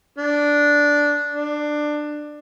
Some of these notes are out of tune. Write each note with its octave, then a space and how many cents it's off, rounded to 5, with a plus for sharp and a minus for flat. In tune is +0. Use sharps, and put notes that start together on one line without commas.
D4 -5
D4 +15